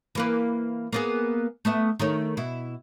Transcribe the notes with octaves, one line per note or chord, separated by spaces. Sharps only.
E3 A#3 B4
A#3 B3 G#4
A3 B3 E5
D#3 A3 C#5
B2 E4